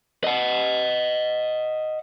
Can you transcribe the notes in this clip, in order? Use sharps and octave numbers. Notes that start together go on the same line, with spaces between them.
D#5 F#5